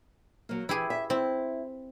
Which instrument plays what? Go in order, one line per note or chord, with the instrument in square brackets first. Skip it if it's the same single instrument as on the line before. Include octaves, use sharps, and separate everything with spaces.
[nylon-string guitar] F#3 A#3
[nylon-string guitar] E3 [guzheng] E4 G4 G#4
[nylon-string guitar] E5
[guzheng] C4 [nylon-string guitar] E4